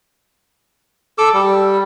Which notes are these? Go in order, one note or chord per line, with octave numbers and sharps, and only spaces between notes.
A4 D6 E6
G3